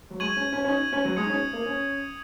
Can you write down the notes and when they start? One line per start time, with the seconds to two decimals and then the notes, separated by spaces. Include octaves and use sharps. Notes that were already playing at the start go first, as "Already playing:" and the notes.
0.10 F#3
0.20 G#3 C#6 G#6 D#7 F#7
0.37 C#4
0.53 C#4
0.64 C#4
0.68 D#4
0.92 C#4
1.05 F#3
1.16 G#3 D#6 G#6 C#7
1.24 D#4
1.30 C#4
1.53 A#3
1.66 C#4